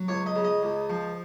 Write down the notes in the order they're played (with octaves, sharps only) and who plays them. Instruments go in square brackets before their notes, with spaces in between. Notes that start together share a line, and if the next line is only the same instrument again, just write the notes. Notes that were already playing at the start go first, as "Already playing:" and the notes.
Already playing: [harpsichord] F#3
C#2 C#5
D#5
C#3
D#5
C#2
F3